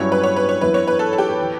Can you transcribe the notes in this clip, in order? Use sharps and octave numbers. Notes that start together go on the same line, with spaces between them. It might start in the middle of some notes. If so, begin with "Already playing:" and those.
Already playing: G2 F#3 C#4 E4 C#5
B4
C#5
B4
C#5
F#2 E3 B3 E4 B4
C#5
B4
A4
A4
G4
E3